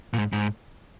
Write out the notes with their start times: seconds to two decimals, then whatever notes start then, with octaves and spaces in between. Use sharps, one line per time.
0.13 A#2
0.18 G#2
0.33 G#2